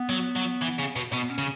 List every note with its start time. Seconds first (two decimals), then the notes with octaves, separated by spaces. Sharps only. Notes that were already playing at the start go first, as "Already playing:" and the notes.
Already playing: B3
0.09 F#3
0.36 F#3
0.61 E3
0.79 C#3
0.96 B2
1.12 B2 B3
1.29 C#4
1.38 C#3